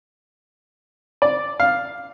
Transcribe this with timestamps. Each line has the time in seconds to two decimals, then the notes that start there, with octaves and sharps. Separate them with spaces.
1.22 D5
1.60 F5